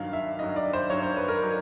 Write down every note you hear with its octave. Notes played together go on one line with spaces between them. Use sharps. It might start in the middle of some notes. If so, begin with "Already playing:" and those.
Already playing: G2 D#3 F#3 F5
E5
G2 D#3 F#3 D#5
D5
C5
G2 D#3 F#3 C#5
C5
B4
A#4
D#3 F#3